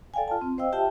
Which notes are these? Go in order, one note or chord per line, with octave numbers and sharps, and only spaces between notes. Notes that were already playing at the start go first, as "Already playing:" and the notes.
A4 D5 F5 G5 G#5
F4 A5
C4
C5 D#5 F5 G5 E6
F4 G4 E5 G5 A5